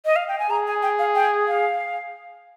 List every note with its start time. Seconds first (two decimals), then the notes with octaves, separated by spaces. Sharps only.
0.05 D#5
0.16 F5
0.28 G5
0.39 G#5
0.50 G#4 A#5
0.67 G#5
0.82 G5
0.99 F5
1.15 G5
1.48 F5